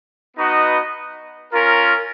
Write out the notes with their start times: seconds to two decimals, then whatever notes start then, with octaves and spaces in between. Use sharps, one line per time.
0.37 B3 D#4 F#4 B4 D#5
1.53 C#4 F4 A#4